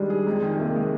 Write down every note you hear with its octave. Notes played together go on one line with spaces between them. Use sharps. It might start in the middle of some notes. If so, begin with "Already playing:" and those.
Already playing: D#3 G3 G#3 D4
G#4
F2 G#3
D#3
C3 A#3
G#3